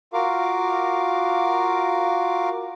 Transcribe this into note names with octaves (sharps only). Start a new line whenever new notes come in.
F4 F#4 A#4 F5 D6